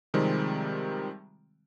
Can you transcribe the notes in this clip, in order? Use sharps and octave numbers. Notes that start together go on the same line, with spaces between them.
C3 D#3 F3 G3 G#3 C4